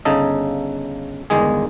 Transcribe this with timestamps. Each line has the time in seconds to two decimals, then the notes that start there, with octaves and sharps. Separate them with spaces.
0.05 G1 C#3 D#4 A4 D#5
1.30 G1 E2 D#3 G#3 G#4